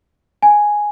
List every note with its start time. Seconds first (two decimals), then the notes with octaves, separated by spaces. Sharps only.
0.43 G#5